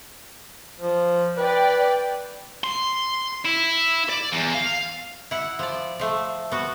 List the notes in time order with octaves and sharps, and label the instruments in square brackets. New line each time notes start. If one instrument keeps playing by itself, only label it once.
[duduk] F3
[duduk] B4 [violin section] D5 G5
[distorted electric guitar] C6
E4
D5
E2
F5
[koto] E4 F#5
F3 D5
F3 A3
B3 F#4